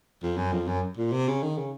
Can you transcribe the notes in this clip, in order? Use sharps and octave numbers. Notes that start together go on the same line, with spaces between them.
F2
F#2
F2
F#2
A#2
C3
C#3
D#3
C#3